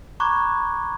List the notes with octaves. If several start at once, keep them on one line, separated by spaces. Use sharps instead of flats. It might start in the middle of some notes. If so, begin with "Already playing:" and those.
A#5 B5 C#6 D6 F#6 G#6